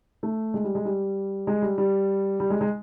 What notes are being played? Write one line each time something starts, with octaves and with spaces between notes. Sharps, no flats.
A3
G#3
G3
G#3
G3
G#3
G3
G3
G3
G#3
G#3